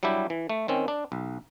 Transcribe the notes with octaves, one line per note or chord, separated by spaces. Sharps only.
F#3 G3 D4 E4 G4
E3
A3
D#3 C4 C#4
D4
B1